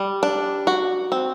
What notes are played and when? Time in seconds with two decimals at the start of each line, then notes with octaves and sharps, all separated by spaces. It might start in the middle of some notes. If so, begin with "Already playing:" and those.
Already playing: G3
0.23 D4
0.67 F#4
1.12 C4